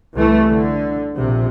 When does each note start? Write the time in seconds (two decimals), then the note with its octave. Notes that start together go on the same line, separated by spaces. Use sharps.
0.15 C2 E3 A3
0.51 D3
1.17 A#1 C3